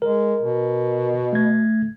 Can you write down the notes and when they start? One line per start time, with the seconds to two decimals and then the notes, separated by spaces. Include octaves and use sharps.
0.02 G#3 A#4
0.42 B2
1.33 A3 G#6